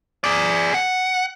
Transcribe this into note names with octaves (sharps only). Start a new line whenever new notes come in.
G#4 D5
F#5